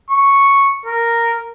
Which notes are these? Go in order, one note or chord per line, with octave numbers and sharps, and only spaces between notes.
C#6
A#4